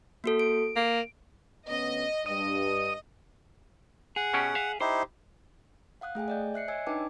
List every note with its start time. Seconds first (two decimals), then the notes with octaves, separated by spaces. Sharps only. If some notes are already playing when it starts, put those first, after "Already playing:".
0.24 A#3 F#4 A4
0.39 D7
0.76 A#3
1.69 D2 B3 C#4 D#5
2.26 G2 D#5 D#6
4.16 G#4 F#5
4.34 B2 C#4 G4
4.55 E5 F5
4.80 D#4 E4 G4 C5
6.01 F5 F#5 D#6 F#6
6.15 A3 G#4 G5 G#5
6.28 D5 D#5 G6
6.54 E5 F#6 C7 C#7
6.68 C#5 D#5 G#5 E6 G#6
6.87 D4 D#4 B4 G5 A5 D6